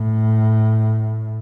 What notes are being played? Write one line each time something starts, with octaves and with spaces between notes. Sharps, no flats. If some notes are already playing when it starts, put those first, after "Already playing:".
Already playing: A2